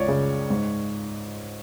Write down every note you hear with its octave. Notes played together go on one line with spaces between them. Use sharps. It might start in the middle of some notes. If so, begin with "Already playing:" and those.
Already playing: C#2 C#5 D5
C#3
G#2